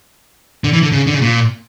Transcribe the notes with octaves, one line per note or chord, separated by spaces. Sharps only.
D3
E3
D3
C#3
D3
C#3
A#2